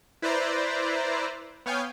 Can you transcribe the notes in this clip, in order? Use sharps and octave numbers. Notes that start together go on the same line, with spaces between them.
E4 B4 C5 D5 A#5
B3 C#5 F5 G5 G#5